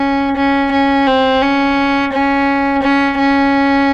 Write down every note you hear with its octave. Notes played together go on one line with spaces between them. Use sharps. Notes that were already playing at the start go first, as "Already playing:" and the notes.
Already playing: C#4
C#4
C#4
C4
C#4
C#4
C#4
C#4